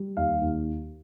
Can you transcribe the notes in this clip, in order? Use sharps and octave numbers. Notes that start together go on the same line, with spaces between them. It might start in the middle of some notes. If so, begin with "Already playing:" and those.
Already playing: G3
D#2 F5
D#2